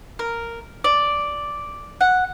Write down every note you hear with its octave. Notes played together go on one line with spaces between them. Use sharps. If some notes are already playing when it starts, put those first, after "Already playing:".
A#4
D5
F#5